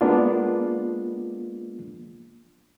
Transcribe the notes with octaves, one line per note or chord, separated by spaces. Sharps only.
G#3 A#3 B3 D4 F4